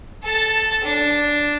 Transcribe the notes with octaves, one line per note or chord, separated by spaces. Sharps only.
A4 A5
D4